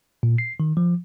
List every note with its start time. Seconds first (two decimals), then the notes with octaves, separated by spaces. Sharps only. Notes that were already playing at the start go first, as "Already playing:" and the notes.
0.23 A#2
0.38 C7
0.60 D#3
0.77 F3